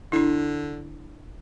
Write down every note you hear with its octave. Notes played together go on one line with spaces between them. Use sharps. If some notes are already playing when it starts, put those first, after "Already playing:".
D3 D4 E4